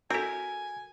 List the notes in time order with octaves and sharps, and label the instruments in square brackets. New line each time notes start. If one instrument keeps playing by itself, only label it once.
[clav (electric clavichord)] C4 E4 [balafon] F#4 A4 [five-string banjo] A#4 [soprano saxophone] G#5